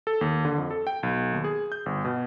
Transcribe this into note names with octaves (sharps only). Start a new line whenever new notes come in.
A4
D#2
D3
F2
A4
G5
B1
D#2
G#4
G6
G1
B2